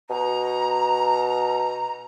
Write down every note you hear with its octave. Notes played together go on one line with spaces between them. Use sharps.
B2 A#5